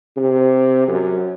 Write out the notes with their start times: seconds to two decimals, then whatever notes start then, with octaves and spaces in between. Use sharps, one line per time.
0.17 C3
0.88 F#2